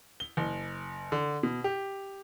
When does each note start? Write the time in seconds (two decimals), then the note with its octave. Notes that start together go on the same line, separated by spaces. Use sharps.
0.20 G7
0.37 F#1
1.12 D3
1.43 B2
1.64 G4